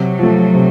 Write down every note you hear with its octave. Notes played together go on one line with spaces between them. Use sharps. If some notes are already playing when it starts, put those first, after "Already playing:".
Already playing: C3 F#3
F3 A3
C3